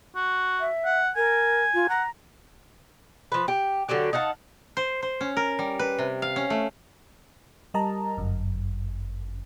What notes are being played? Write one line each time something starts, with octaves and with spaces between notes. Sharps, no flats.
F#4
E5
F#5
A#4 G#5
F4
F#5 A#5
F3 B4
G4
D3 F#3 F#4 G4
D#4 F5 F#5 A5
C5
C5
C#4
A#4
G3
B4
C3
F5
C#4
A3
G3 A#4 D#5 A5 A#5
G1 F#2